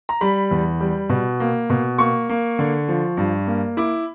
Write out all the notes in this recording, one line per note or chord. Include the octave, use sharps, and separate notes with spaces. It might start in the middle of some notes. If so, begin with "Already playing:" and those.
A#5
G3 B5
E2
G3
B2
A#3
B2
A#3 C#6
A#3
D3
F3
G2
A#3
E4 D6